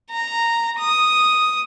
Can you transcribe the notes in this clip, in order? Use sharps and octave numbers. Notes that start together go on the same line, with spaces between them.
A#5
D#6